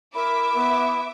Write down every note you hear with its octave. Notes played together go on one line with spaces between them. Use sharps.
E4 A#4 E5 D6
B3